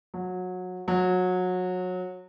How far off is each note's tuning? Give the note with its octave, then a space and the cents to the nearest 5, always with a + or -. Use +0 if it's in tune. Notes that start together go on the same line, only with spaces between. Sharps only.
F#3 -25
F#3 -25